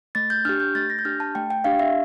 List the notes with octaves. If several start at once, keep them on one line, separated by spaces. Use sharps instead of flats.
A3 A6
G6
D4 G4 F6
G6
A3 A6
A#6
G6
D4 G4 F6
A5
A3 G5
G5
D4 G4 F5
E5